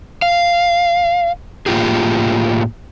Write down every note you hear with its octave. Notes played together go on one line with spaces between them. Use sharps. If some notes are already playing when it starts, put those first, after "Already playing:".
F5
A2 A#3 F4 G4 G#4